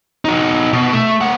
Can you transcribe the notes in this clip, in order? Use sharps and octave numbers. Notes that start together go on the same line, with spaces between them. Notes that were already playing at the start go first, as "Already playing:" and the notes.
D#4 F#4
B2
A3
A#3 F#5